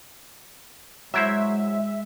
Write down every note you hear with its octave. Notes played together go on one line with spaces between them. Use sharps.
F#3 G#3 E4 C5 E5